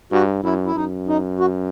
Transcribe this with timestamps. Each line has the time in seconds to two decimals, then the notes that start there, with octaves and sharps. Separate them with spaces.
0.12 G2 F#4
0.44 F#2 E4
0.66 E4
0.75 F#2 D#4
1.08 D#4
1.40 F#4